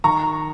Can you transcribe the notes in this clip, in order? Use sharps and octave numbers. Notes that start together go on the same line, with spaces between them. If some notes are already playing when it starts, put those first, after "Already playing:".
D#3 A#5 C#6